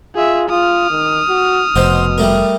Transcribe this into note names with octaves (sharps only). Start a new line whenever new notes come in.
F4 G#4 E5
F4 D#6 F6
D#3
F#4
F1 B2 D#4 C5 F#5
G3 A3 A#4